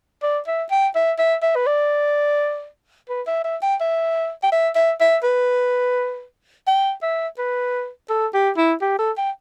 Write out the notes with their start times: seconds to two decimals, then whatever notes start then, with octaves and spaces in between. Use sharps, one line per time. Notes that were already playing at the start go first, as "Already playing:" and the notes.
0.23 D5
0.47 E5
0.71 G5
0.95 E5
1.19 E5
1.43 E5
1.56 B4
1.67 D5
3.09 B4
3.27 E5
3.44 E5
3.63 G5
3.80 E5
4.43 G5
4.52 E5
4.75 E5
5.00 E5
5.24 B4
6.67 G5
7.03 E5
7.38 B4
8.10 A4
8.34 G4
8.57 E4
8.81 G4
8.99 A4
9.18 G5